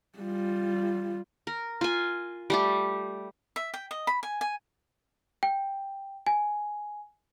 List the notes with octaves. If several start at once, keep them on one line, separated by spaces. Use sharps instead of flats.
G3 F4
A#4
F4 G#5
G3 A3 G4
E5
G5
D#5
B5
G#5
G#5
G5
G#5